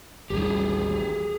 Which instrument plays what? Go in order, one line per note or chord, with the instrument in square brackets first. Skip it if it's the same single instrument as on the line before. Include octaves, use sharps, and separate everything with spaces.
[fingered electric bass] A1 D#2 G3 [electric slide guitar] G4 G#4